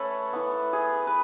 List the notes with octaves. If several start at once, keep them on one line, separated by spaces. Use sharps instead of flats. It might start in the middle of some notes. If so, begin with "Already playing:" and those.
Already playing: A3 C#4 A4 B4 C#5
E3 B3
G#4
B4